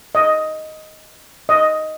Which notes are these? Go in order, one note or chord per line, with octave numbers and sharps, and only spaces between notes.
D#5
D#5